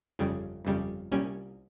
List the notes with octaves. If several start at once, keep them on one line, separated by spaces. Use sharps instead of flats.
G1 F2 C#3 G3
G1 F2 C#3 G3
C2 A#2 G3 C#4